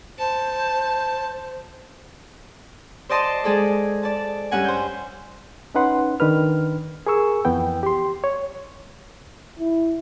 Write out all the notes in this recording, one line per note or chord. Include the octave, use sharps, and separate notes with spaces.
C5 A5
C5 D5 D#5 A5 C6
G#3 G#4 A4 D5
D5 A5
G2 C#4 F#5 G#5
C5 G6
C#4 D#4 B4 F#5 C6
D#3 D4 B4 F6
G#4 A#4 C#6 E6
F2 E3 B3 G5
G4 C6
C#5
E4